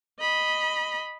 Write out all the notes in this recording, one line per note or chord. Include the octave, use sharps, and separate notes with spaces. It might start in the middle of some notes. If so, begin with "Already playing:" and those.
D#5 B5